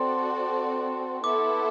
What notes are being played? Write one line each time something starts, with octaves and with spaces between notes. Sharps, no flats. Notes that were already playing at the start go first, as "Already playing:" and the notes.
Already playing: C4 F#4 A4 D5 C6
B3 E4 A4 D6